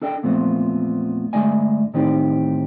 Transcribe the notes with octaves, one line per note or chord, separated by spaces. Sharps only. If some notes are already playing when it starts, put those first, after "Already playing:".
D4 A4 D#5 G5
E2 A#2 F3 A3 B3 C4
G2 D3 G#3 A3 D#5 G#5
A2 D#3 E3 C4 D#4 G4